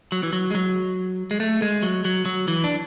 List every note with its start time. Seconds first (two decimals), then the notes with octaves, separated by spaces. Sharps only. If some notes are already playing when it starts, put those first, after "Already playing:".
0.12 F#3
0.23 E3
0.33 F#3
0.51 G#3
0.55 F#3
1.31 G#3
1.40 A3
1.62 G#3
1.83 F#3
2.05 F#3
2.26 F#3
2.48 E3
2.64 D4